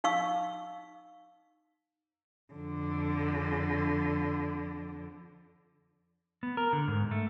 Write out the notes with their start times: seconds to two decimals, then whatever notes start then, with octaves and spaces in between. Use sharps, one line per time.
0.04 D#4 F5 C#6 E6
2.54 F2 D3
6.43 B3
6.57 A#4
6.73 D3
6.88 G#2
7.11 A3